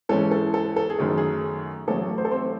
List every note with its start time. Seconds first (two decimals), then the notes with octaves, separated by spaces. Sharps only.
0.09 G#2 E3 G#3 C#4 A4
0.31 A4
0.54 A4
0.76 A4
0.90 G#4
0.98 F#2 D#3 A3
1.18 G#4
1.87 A1 A2 F#3 A3 A4
2.18 C5
2.25 A4
2.31 C4 C5